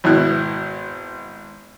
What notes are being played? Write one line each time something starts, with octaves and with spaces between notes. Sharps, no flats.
G#1 B2 E4 F#6